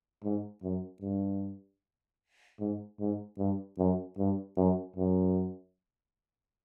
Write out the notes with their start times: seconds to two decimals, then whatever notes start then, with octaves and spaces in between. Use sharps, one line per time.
0.24 G#2
0.63 F#2
1.02 G2
2.60 G#2
2.99 G#2
3.38 G2
3.78 F#2
4.18 G2
4.57 F#2
4.96 F#2